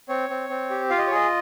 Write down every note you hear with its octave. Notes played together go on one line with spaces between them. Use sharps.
C4 C#5
C4
C4
G4
F4 F5
D#5
C#5
G#4 D#5